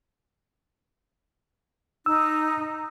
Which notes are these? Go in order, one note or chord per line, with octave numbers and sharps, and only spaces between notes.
D#4 E6